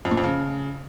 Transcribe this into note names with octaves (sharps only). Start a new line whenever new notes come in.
F2
A#2
F2
C#3